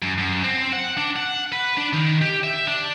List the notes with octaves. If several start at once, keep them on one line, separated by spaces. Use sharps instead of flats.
F#2
F#2
C4
F#5
D4
F#5
B4
D4
D#3
G4
E5
D4